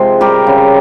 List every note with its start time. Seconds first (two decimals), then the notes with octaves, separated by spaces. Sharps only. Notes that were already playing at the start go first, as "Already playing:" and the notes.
Already playing: C3 F3 G#3 C5
0.21 G3 G4 A#4
0.47 C#3